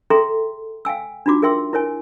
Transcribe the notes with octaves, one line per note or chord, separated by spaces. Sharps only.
G#4 A4 E5 G5 A#5 C6
F5 G5 G#5 E6
D4 D#4 F4 F#4 D6
G#4 A#4 E5 G5 C6 E6
E4 A#4 C#5 G#5